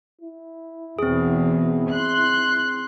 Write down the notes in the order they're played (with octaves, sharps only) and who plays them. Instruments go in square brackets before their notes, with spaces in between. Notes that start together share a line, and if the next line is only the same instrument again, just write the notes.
[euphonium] E4
[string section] E2 B2 [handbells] C4 G#4
[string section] C6 F#6